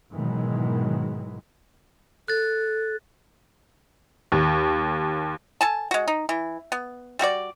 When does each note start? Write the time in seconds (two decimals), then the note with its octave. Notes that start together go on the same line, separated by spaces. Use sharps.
0.13 G#2 B2 D#3 E3 F#3 G#3
2.28 A4 F#6 A6
4.32 D#2
5.61 A4 G#5 A5
5.91 G#3 F#4
6.08 D#4
6.29 E3
6.72 B3
7.19 G3 A3 F#4 D5